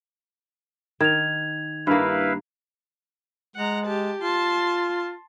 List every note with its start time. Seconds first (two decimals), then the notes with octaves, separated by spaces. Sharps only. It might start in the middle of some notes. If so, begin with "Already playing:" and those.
1.01 D#3 G#6 F7
1.87 G2 A#3 E4 B4 F5
3.56 G#3 F#5 A#5
3.86 G4 A5
4.21 F4 A5 C6